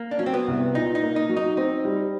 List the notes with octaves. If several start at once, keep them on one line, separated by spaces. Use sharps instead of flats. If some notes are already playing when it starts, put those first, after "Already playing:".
Already playing: A#3
D4
F#3 C#4
C4
B3
C2
A#2 D#4
D#4
A#3
D#4
F#3
D#4
C4 D#4
G3